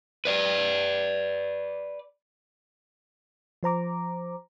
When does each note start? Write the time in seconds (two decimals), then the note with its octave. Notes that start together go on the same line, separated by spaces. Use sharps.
0.25 B4 D5
3.63 F3 C5 A#5 D6